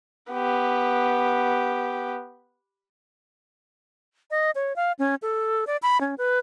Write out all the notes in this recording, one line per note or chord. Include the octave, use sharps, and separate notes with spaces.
B3 G4
D#5
C#5
F5
C#4
A4
D5
B5
C#4
B4